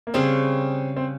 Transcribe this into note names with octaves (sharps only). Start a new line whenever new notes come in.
A#3
C#3 G3 C4 C#4 G#4
C4